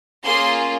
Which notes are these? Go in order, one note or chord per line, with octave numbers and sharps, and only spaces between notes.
A#3 C#4 F4 G#4 C6